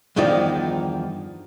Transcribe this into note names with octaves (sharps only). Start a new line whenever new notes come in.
E2 G2 D#3 F3 D#4 D5